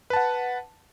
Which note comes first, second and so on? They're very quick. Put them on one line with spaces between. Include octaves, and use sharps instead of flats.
B4 A5 F#5